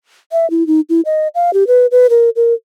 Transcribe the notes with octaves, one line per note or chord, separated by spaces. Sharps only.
E5
E4
D#4
E4
D#5
F5
G4
B4
B4
A#4
A#4